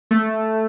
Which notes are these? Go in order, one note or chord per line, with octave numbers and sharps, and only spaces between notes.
A3